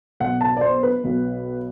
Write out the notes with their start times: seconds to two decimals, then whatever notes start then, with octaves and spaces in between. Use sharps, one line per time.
0.20 B1 B2 F#5
0.41 A5
0.57 D5
0.61 C5
0.83 B4
1.04 B1 B2